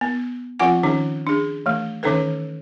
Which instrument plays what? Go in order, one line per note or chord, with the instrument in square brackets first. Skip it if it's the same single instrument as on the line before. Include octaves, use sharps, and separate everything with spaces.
[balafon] B3
F3 C4 F4 F#5 G#5
D#3 C#4 D#4
D4 G#4
E3 A3
D#3 E3 C#4 D#4 A4 B4